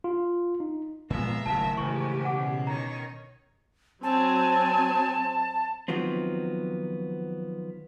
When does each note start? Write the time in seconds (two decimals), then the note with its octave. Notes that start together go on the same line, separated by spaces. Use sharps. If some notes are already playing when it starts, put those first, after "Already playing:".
0.04 F4
0.60 D#4
1.10 A#2 F3 G#3 B3 F4 E5 A#5
1.46 F#1 F#2 A2 D#3 A5
1.77 G#2 C#3 E3 G4 C#6
2.25 B2 C#4 F#5 D6
2.67 D#3 D#4 C#5 A#5
4.03 F#3 C4 G#5 A5
5.88 D#3 F3 F#3 B3 C4